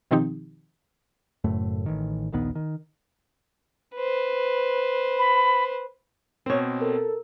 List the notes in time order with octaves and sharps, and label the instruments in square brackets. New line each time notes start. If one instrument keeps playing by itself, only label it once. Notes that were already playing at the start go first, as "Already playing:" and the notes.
[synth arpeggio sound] B2 D#3 F3 C4 D#4 G4
[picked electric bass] F#1 F#2 A2 A3
A1 D#3
D#1 A#1 D#3 B3
D#3
[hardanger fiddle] B4 C5
[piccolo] B5
[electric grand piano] B2 C4 [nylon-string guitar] C5 C#5
[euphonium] A4 [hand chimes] A#4